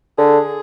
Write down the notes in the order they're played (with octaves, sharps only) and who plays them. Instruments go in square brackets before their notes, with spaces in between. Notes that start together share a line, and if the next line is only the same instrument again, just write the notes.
[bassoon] D3 [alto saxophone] G#4